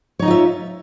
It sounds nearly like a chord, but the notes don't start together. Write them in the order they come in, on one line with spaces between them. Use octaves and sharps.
C#5 D#4 D#5 F4 E5